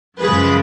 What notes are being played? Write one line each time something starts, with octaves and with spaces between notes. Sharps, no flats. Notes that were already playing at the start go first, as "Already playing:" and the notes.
F#2 C#3 F3 G#3 G#4 B4